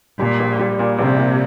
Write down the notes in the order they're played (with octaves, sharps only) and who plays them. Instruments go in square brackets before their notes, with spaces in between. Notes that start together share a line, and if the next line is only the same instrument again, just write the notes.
[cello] A#2 [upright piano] G3
[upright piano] A#1
G3
A#2
[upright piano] A#1 [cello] C3
[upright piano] A#2